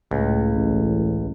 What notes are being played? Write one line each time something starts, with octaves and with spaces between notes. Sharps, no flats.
C#2 A2
A1